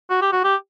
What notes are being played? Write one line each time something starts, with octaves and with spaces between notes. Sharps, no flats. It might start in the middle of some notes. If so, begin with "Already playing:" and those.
F#4
G4
F#4
G4